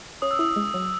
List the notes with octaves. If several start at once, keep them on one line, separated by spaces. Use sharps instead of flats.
C#4 D#6
E6
E4 D#6
G#3
F#3